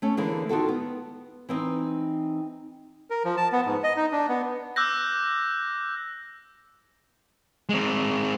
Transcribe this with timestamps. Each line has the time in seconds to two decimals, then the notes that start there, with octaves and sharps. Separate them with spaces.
0.02 A3 C#4
0.17 D3 E3 G#3 A#3
0.49 D#3 F4 F#4 A4
0.68 B3
1.49 E3 C4 D#4
3.10 A#4
3.25 F3
3.37 A5
3.52 B3
3.66 G#2
3.84 D#5
3.96 D#4
4.12 D4
4.29 B3
4.76 D6 E6 F#6 G6 A#6
7.69 G#3 C4